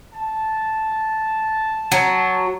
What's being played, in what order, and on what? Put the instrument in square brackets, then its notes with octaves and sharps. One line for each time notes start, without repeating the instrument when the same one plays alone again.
[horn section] A5
[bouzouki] F#3